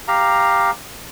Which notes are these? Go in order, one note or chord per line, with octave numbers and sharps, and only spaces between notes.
G4 F5 A#5